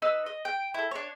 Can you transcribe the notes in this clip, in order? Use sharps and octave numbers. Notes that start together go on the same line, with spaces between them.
D#4 B4 E6
D#5
G5
E4 A4
D4 C#5